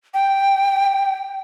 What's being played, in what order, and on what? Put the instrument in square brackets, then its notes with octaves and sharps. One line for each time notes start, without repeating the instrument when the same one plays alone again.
[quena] G5